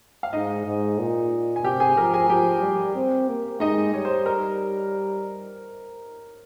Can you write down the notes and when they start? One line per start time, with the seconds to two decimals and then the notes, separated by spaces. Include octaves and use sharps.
0.23 F5
0.33 G#2 D#4 D#5
0.66 G#2
0.98 A#2
1.56 G#5
1.64 C3 G4 G5
1.80 G#4 G#5
1.97 F3 A#4 A#5
2.13 G#4 G#5
2.29 F3 G4 G5
2.62 G3
2.96 C4
3.29 A#3
3.60 G#3 D#4 D#5
3.94 G3 C#5
4.05 C5
4.26 A#4